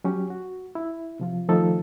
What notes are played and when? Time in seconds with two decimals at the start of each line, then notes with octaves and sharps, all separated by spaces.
0.04 F#3 C#4 G4
0.30 F#4
0.75 E4
1.20 C3 F3 F4
1.48 D#3 F3 A3 D#4 A4